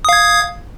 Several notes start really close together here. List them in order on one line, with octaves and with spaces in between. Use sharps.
D#6 F5 G#6